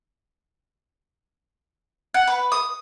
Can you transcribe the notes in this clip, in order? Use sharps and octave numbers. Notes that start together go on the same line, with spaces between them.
F#5
B4
D#6